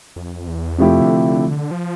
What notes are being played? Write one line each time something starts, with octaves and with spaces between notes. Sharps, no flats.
F2
E2
F2 C3 F3 A3 E4 G4
D3
D3
D3
F3